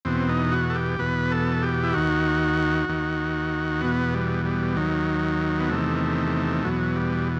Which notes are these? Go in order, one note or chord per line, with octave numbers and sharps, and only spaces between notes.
E2 B2 C4
D#4
F#4
A4
G4
E2 B2 B4
A4
G4
E4
D#2 D#3 F#4
D#2 D#3
E2 B2 B3
G3
G3
D#2 D#3 F#3
B3
E2 C3 D#3 A3
E2 B2 F#3
G3